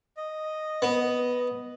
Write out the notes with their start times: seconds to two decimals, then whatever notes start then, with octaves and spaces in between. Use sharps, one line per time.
0.17 D#5
0.82 B3